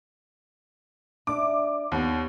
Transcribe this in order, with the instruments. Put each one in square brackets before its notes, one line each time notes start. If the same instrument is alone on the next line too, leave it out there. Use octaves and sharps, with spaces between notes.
[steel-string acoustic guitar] D4 D5 E5 [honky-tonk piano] D6
[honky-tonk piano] D#2 B3 [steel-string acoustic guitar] F4